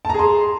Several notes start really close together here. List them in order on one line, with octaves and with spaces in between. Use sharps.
A5 A#5 G#4 C6